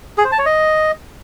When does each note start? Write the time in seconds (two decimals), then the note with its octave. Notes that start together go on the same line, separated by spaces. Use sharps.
0.18 G#4
0.25 C5
0.32 A5
0.39 C#5
0.46 D#5